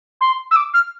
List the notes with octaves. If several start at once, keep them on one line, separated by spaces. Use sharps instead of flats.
C6
E6
D6
F6